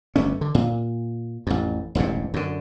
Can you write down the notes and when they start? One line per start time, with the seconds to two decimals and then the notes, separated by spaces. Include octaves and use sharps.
0.16 G1 G2 A3 C#4
0.41 D3
0.55 A#2
1.47 A1 F2
1.95 E1 A1 G2 C3
2.34 F#2 D3